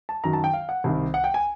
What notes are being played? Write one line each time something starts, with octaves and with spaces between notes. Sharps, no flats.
A5
F#2 D#3 F#3 A#5
A5
G5
F5
F#5
C2 C3 D#3
F#5
G5
G#5